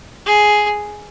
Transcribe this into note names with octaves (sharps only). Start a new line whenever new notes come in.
G#4